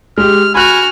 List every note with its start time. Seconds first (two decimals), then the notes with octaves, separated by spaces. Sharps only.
0.18 G#3 G4 F6
0.55 F#4 G#5 B5 F6 F#6